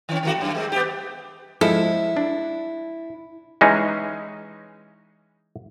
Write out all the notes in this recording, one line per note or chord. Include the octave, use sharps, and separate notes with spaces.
D#3 C#4
D#3 A3 F#4
F#2 G3
G#3 A#3 C4
B3 G4
F3 G#3 E4 A4
D4
E3 G#3 C#4 D#4